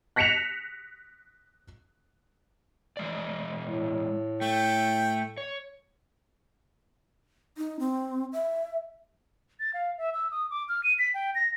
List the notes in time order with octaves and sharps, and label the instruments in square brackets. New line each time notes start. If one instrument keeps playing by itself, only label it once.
[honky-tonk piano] F#6 A#6 B6 C#7 E7 F7
[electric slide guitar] E3 G#3 D5
[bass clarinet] A2
[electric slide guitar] A3 [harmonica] G5
[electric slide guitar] C#5
[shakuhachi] D#4
C4
E5
[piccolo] A6
F5
E5
E6
D#6
D6
F6
D#7
B6
G5
A#6